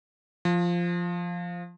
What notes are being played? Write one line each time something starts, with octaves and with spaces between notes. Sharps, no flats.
F3